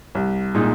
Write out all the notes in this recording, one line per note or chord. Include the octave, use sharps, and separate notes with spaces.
C2
A#2 G#3 D#4